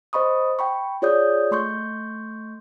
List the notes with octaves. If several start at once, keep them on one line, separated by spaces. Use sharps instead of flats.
C5 D#5 B5 C#6 D#6
G5 B5 C#6
F4 G#4 C#5 D5 D#6 G6
A3 C6 C#6 G6